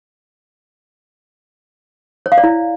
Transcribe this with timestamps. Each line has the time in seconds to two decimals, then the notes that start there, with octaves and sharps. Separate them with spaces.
2.26 C#5
2.32 F5
2.38 D5
2.44 E4